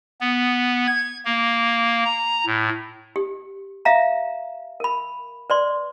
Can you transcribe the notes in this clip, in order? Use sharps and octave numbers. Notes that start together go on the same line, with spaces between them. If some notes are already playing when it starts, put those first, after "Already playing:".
B3
G#6
A#3
A#5
A2
G4
E5 F5 A#5
A#4 B5
B4 D5 C6